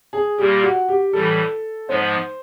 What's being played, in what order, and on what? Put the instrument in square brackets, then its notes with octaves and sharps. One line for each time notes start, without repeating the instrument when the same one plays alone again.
[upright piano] G#4
[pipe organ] A#2 G3 A#3 [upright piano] G4
[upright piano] F#4
G4
[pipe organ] A2 E3 G3 [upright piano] A4
[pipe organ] G#2 F3 G#3 B3 [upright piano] C5